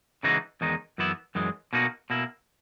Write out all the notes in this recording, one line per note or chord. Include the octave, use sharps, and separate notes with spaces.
C#3 E3 G#3 D#4 F#4
E2 D#3 G#3 D#4
F#2 E3 B3 E4
F#2 E3 G#3
B2 A#3 D#4 F#4
B2 A#3 E4